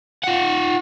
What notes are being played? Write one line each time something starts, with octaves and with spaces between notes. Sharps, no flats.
F4 F#5